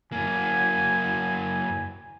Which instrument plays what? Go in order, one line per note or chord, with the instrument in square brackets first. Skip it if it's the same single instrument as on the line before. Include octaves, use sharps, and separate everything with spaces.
[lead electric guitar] F#2 A#3 [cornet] G#5